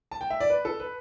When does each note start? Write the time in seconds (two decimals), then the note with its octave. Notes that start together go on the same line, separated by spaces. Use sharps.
0.11 A5
0.21 G5
0.30 E5
0.40 D5
0.50 B4
0.65 A4
0.80 B4